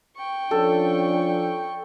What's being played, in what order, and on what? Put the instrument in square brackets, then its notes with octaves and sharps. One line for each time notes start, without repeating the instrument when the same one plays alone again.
[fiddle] G5 C#6
[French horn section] F3 C#4 D4 [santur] A4